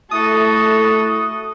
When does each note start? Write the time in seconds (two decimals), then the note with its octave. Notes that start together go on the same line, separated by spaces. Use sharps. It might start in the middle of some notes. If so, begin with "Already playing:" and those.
0.11 A3 E4 F#4 A4 D#6